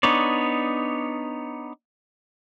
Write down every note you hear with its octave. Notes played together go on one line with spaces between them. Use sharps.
B3 D4 D#4 C#5 D5